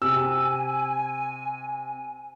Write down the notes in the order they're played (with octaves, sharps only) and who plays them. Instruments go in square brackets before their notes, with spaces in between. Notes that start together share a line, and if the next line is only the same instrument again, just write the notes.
[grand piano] C3 [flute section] G#5 [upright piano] E6